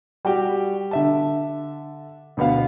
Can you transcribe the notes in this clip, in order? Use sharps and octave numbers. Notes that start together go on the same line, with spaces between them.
G3 F#4 G4
D3 E5 A5
D2 B2 B3 F5